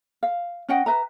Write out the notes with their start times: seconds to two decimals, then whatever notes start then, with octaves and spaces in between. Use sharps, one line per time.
0.23 F5
0.69 C#4 D#5 F#5 G5
0.86 B4 E5 A#5